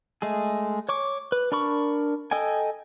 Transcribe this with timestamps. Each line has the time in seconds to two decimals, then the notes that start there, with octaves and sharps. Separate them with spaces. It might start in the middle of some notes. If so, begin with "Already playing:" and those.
0.22 G#3 A3 G#4
0.89 C#5 C#6 D6
1.32 B4
1.52 D4 A#4 B5 C#6
2.31 A4 D#5 G5 G#5